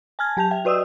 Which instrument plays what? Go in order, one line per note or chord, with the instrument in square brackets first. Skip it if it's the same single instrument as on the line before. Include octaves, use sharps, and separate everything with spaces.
[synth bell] G#5 A5 F6 G#6
F#3 G4 A5 G6 F7
E5 G5
F#4 B4 D5 D#5 D#6 E6